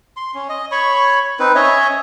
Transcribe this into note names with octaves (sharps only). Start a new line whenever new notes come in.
C6
C#4
D#5
C#5 B5 C#6
C4 D#4 B4
C#4 C#5 D#5 E5